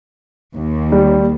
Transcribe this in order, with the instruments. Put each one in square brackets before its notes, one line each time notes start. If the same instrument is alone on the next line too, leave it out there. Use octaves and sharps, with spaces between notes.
[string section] D#2
[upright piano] G3